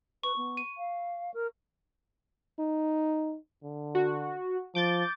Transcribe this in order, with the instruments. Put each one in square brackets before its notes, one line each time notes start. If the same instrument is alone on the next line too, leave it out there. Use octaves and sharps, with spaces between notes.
[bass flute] B4 [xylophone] C#6
[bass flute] B3
[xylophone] D#7
[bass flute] F5
A#4
[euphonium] D#4
D3
[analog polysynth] F#4
[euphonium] F3 [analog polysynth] D6 G6 A6